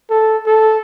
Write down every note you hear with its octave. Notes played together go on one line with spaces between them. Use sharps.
A4
A4